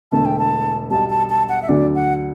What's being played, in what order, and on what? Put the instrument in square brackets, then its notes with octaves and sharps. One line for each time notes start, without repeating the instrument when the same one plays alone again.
[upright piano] E1 E2 D3 A3 [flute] A5
[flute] G5
A5
[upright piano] B1 B2 G3 [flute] A5
[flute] A5
A5
F#5
E5
[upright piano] D2 D3 F#3 [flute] D5
[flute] F#5